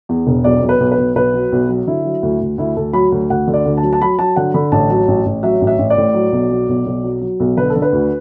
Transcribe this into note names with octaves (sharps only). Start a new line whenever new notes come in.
E2
E1
B1 D5
B1
B4
B1
B4
B1
B1 B4
F#3
B1
F#3
D3 E4
F#3
D2
D2
D2 E4
D2 A4
F#3 B5
D2
D2 F#5
D3
D5
D2
A5
F#3
A5
F#3 B5
F#3 A5
D3 F#5
D3 B5
A1 A5
F#3
A1
A1
F#3 E5
A1
E5
A1
D5
A2
F#3
B1
F#3
B1
B1
F#3
F#3
B1
D3 B4
A4
D3
B4
D2